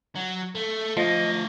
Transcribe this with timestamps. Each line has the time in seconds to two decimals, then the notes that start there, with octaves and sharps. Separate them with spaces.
0.16 F#3
0.55 A3
0.97 F3 A3 D#5 F5